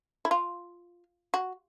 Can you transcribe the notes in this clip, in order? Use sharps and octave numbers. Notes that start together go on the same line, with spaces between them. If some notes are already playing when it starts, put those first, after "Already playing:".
E4
F4
F#4